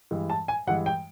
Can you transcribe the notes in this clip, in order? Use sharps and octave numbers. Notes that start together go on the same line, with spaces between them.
G2 E3 G#3
A5
G#5
G2 E3 G#3 F#5
G5